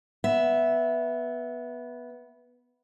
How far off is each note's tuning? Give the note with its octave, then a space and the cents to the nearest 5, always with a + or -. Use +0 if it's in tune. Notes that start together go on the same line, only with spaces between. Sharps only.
B3 -10 E5 +0